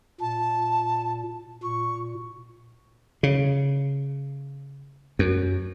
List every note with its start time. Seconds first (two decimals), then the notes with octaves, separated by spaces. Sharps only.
0.20 A#2 A5
1.63 A#2 C#6
3.23 C#3
5.19 F#2